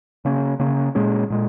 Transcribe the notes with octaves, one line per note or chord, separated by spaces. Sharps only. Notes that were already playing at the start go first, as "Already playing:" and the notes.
C#3 A#3 C#4
C#3 A#3 C#4
A#2 G#3 C#4
A#2 G#3